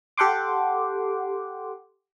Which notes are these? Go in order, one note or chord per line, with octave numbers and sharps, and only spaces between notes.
G4 A4 F#5 G5 C6 D6